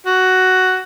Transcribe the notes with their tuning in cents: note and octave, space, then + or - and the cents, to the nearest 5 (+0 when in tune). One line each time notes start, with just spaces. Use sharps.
F#4 +10